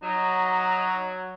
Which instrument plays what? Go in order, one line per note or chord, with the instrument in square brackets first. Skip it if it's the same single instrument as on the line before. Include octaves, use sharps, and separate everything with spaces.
[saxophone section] F#3 [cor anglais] D#4